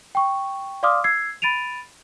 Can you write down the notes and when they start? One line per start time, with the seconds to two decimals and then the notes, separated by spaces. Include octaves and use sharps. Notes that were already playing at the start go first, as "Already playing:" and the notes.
0.15 G5 C#6
0.83 D5 F5 C6 D6 D#6 F6
1.04 E6 G#6 C7
1.42 B5 A6 D7 D#7 F7